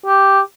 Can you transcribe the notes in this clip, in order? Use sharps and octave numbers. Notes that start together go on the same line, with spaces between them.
G4